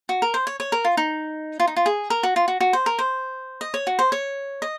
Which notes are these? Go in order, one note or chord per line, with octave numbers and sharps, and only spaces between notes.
F#4
A#4
C5
C#5
C#5
A#4
F4
D#4
F4
D#4
F4
G#4
A#4
F#4
F4
F#4
F#4
C5
A#4
C5
D#5
C#5
F#4
C5
C#5
D#5